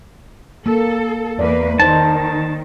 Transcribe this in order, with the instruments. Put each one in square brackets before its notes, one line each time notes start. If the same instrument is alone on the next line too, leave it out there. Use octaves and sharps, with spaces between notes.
[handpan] A#3 [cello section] A4
[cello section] E2 A#3 B4 [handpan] D5
[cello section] D#3 [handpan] D#4 C5 [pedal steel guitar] A5